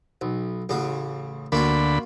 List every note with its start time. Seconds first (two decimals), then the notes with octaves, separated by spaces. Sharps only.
0.21 B1
0.69 A1 C#3 F#4
1.52 D2 D3 A#3 F4 F#4 B5